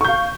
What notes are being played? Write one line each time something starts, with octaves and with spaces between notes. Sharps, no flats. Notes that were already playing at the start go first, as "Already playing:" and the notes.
F5 C#6 G6